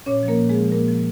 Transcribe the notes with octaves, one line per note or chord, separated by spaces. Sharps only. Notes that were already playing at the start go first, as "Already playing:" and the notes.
A#2 C#4 C#5
F3
A#3 A#4
A#2
G#3 G#4
F3
A#2 A#3 A#4
F3